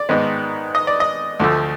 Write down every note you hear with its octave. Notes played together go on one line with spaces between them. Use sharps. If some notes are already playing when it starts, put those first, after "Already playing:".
Already playing: D5
G#2 D#3 G#3 B3
D#5
D5
D#5
D2 D3 F3 A3